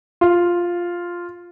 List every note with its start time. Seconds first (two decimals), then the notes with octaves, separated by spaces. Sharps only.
0.21 F4